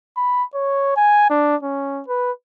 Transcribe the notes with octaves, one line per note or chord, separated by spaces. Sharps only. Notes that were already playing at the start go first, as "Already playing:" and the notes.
B5
C#5
G#5
D4
C#4
B4